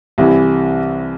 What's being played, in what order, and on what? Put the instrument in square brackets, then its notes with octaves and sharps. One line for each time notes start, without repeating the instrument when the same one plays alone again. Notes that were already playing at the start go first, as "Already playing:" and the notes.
[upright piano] C2 C3 E3